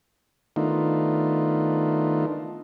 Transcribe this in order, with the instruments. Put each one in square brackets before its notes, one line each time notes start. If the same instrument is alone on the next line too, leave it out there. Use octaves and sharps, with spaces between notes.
[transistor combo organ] D#3 A3 B3 D4 D#4 F4